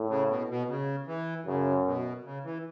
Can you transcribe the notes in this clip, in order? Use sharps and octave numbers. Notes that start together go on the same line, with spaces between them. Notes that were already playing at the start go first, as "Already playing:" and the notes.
Already playing: A2
C#3
B2
B2
C#3
E3
F#2 C#3
B2
C#3
E3